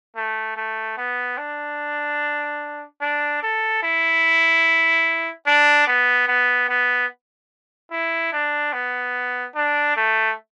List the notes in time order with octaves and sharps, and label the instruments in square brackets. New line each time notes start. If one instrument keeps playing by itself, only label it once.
[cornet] A3
A3
B3
D4
D4
A4
E4
D4
B3
B3
B3
E4
D4
B3
D4
A3